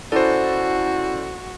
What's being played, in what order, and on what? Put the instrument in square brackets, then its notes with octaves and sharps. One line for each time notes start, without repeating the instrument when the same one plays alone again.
[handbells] C#4 E4 D5 [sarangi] F#4 [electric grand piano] A4 C5